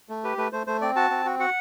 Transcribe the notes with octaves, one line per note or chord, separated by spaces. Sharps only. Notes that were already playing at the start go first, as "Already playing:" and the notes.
A3
G4 B4
A3 B4
A3 C5
A3 C5
C4 D5
F#4 A5
C4
F#4
F#4 F#5